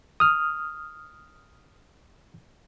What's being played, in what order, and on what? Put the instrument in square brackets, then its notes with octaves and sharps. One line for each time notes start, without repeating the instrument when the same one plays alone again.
[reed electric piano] D#6 F6